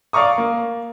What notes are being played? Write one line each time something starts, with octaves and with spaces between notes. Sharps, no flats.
D5 F5 A#5 C#6 D#6
A#3